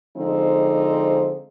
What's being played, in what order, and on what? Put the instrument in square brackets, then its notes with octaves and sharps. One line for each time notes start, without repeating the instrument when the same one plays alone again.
[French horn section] D3 F3 G#3 C4 D#4